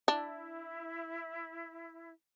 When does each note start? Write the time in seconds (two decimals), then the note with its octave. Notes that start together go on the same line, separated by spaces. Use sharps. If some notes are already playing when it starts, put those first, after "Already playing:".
0.08 D4 E4